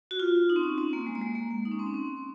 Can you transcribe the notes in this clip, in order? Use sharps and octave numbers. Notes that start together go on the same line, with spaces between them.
F#4
F4
D#4
C4
C#4
C4
A#3
G#3
A#3
G#3
A#3
A#3
D#4
C#4
C4
C#4
C4